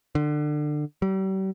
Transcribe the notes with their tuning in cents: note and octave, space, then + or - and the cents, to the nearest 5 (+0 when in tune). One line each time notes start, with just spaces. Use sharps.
D3 +25
G3 -40